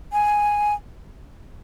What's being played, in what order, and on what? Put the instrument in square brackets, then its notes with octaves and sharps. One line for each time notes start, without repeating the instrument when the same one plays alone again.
[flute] G#5